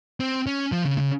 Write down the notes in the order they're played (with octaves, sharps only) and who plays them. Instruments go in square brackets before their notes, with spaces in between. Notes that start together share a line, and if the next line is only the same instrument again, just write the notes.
[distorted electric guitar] C4
C#4
F3
C#3
C#3